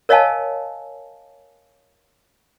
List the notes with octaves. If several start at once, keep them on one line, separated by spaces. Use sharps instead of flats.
A#4 C#5 D#5 F5 G#5 A5